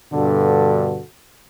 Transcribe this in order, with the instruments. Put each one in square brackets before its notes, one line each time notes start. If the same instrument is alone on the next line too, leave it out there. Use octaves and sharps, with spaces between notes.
[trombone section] G2 B2 D3 F#4 A4